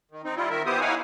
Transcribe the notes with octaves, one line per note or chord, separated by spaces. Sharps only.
D#3
C4 D#4
G3 E4 F4
D#3 A#4 E5
B3 E4 G4 C5 D#6
D#4 E4 C#5 F5 F#5 G#5